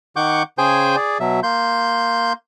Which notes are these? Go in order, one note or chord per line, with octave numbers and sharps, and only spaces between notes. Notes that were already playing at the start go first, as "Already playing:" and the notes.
D#3 F#5 C#6 D6 G6
C#3 G#4 C5 G5 G#5 G6
G#4 D5
B2 F#3 E5
A#3 C6 G6